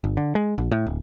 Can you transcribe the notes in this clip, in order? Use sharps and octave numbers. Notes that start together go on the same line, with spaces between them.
G1
D3
G#3
A#1
A2
D1